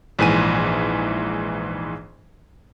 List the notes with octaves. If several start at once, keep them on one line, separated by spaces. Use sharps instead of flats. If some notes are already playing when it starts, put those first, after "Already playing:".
A#1 G#2 E3 G#5 D#7